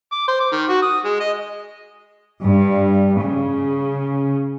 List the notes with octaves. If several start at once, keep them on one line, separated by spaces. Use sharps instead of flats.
D6
C5
D6
D#3
F#4
D#6
G#3
D#5
G2
C#3